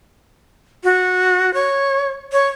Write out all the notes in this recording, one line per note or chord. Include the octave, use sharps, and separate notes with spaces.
F#4
C#5
C#5